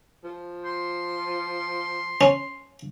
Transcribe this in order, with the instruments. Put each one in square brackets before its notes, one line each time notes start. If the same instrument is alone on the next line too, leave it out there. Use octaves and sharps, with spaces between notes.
[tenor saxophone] F3
[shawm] C6
[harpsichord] C#4